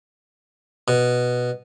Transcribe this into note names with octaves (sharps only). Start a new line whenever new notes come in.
B2